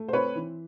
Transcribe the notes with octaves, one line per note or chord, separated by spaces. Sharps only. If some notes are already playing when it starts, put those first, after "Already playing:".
Already playing: A3
C5
C4 B4 C#5
E3